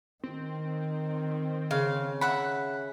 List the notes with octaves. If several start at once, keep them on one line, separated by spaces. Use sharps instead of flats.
D#3 C4
C#3 F5
E5 F#5 B5